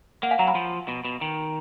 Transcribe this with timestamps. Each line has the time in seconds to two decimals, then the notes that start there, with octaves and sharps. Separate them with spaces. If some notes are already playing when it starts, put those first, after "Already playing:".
0.23 A#3 F#5
0.31 F5 G#5
0.39 F#3 F#5 A#5
0.47 G#5 B5
0.55 F3
0.88 B2
1.05 B2
1.21 D#3